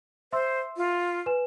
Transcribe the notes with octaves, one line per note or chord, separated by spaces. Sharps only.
C5 E5 C6 E6
F4
B4 G#5 E7